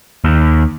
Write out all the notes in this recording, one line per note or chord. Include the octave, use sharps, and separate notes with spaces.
D#2